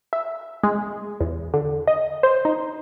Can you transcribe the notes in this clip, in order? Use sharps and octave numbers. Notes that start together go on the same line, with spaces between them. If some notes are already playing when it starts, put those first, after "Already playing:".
E5
G#3
E2
D3
D#5
C5
D#4